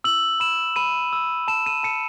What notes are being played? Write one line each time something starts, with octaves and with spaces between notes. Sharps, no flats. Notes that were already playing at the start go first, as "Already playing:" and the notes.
E6 F#7
B5 E7
B5 D#7
E6
A5 E7
D#7
A5 C#7